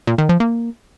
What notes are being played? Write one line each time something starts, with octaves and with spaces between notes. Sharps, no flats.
A#2
D#3
F3
A#3